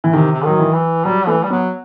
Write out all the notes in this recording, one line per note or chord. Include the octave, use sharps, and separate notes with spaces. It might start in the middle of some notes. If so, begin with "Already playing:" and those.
E3
C3 D#3
C3
D#3 F#3
E3
E3
F#3 G3
E3 A3
G3
F#3 B3